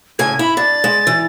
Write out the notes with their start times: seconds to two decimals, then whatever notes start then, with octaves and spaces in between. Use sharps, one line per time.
0.19 A2 C#3 G#5 G#6
0.39 E4 B5
0.57 D4 A6
0.84 G#3
1.07 E3